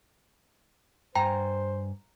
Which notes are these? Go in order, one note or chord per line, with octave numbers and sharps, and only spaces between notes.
G2 C5 G5 G#5 A#5